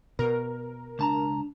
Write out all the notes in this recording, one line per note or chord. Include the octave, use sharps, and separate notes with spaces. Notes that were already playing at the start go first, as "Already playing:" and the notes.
B2 A#4
C#2 D4 A5 A#5